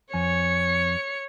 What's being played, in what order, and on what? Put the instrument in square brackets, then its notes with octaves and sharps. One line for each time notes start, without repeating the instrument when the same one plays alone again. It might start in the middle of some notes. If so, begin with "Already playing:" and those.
[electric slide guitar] F2 G#5 [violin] C#5 C#7